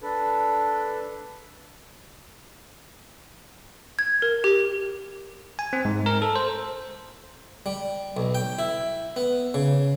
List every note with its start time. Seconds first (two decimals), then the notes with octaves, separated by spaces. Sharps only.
0.01 D4 A4 B4
3.99 G#6
4.22 A#4
4.44 G4
5.59 G#5
5.73 C4
5.85 G#2
6.06 A#4
6.22 A4
6.36 C5
7.66 G3
8.17 B1
8.35 G5
8.59 E4
9.16 B3
9.54 C#3